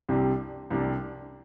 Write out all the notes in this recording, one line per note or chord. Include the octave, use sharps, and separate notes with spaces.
C2 C3 G3 D4
C2 C3 G3 D4